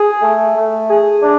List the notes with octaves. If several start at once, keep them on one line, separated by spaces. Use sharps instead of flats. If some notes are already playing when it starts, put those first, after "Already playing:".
Already playing: G#4
A3
A3
G#4
D4